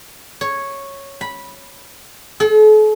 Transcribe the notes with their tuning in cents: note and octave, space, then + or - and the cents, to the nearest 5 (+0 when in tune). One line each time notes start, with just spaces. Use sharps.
C#5 -5
B5 -10
A4 -45